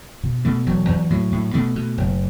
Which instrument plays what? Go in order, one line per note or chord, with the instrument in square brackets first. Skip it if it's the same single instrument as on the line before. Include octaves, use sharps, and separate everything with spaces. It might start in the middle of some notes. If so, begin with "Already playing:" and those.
[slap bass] B2
B2 A3
E1 F#3
E2
A2 F#3
A2
B2 A3
B2
F#1